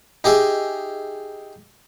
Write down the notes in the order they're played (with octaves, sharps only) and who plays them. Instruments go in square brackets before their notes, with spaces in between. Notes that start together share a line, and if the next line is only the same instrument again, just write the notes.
[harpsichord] D#4 G4 G#4 E5